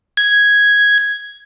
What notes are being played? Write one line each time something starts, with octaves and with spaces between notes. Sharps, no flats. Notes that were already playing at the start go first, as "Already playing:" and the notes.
G#6